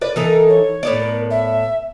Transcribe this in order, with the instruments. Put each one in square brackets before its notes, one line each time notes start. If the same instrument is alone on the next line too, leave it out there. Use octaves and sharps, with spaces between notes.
[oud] B4 D5
[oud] E3 D#4 A4 [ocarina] A#4
[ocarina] C#5
[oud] A2 B3 D5
[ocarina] A#4
E5